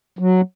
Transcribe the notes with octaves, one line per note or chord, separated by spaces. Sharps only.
F#3